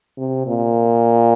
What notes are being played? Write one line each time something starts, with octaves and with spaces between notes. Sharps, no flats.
C3
A#2